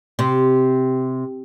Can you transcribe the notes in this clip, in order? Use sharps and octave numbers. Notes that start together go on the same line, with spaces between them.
C3